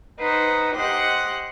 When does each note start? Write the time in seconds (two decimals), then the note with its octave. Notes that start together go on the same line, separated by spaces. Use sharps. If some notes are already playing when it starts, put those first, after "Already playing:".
0.19 D#4 B4 C5 F#5
0.76 G4 C5 D#5 F#5 C6 F#6